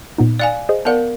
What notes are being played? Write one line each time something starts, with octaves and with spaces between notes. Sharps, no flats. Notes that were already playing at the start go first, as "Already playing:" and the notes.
A#2 B3 D#4
D5 F5 G#5 F#6
G#4 C5 D#5
B3 A#4 D5 F5 F#5 A5